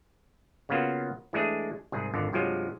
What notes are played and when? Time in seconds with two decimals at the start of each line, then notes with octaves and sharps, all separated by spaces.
0.69 C#3 A#3 B3 F4 F#4
1.33 E3 G#3 A3 D4 G#4
1.92 C2 G#2 G#4
2.14 G#1 F2 D3
2.33 G2 C3 F3 F#3 G#3